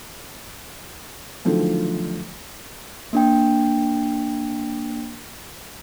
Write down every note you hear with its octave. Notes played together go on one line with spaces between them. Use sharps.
D3 D#3 F3 F#3 A3
A#3 D4 G5